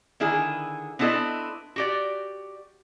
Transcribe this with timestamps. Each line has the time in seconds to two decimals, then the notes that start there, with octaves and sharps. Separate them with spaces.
0.20 D3 D#3 E4 G#4
0.99 B3 C4 D4 E4 A4 D#5
1.76 F#4 G4 D5